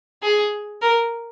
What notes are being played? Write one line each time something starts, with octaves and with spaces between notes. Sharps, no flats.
G#4
A#4